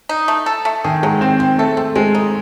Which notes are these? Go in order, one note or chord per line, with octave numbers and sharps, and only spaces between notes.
D#4
A3
A4
A3
D#3 G#4
F#3 G#3
C4 C5
C4 C5
A3 A4
C4
G#3 C4
D#4